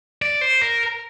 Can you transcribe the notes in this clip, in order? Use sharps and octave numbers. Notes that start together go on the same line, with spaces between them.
D5
C5
A#4